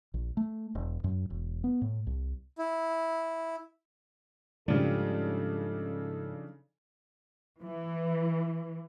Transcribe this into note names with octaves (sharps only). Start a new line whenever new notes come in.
A#1
A3
E1
F#2
E1
B3
A2
C2
E4
G#2 C#3 F3 G3 D4 D#4 A4
E3